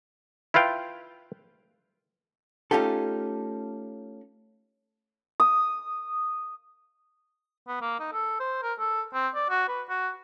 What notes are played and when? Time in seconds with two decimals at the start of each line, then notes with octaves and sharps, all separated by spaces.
0.54 E4 F4 B4 F5 G5
2.71 A3 C#4 D#4 F4 G4 A4
5.40 D#6
7.68 B3
7.81 A#3
8.00 D#4
8.12 A4
8.40 C5
8.62 A#4
8.79 A4
9.14 C4
9.35 D5
9.49 F#4
9.68 B4
9.90 F#4